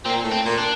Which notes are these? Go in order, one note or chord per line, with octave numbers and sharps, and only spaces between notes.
A#2 C4
A2
C4
A#2
D4